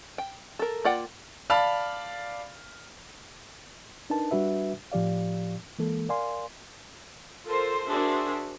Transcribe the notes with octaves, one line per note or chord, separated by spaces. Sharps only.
G5
A4 A#4
A#3 F4 D5 F#5 G5
D5 F5 A5 B5 F6
D4 D#4 A#4 B4 A5
G3 D4 F#4 B4 E5
A2 F3 G4 D5 F5
E3 G#3 A#3 A4
A#4 D5 F5 G#5 C6
F4 A4 A#4 C5
D4 F#4 G#4 A#4 C5 E5